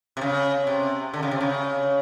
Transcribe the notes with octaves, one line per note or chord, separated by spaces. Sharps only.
C3
C#3
C3
D3
C#3
C3
C#3